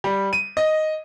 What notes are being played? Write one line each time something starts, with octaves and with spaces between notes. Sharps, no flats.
G3
D#7
D#5